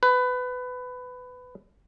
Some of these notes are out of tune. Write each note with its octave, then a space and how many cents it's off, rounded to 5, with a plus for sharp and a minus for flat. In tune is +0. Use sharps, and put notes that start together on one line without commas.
B4 +20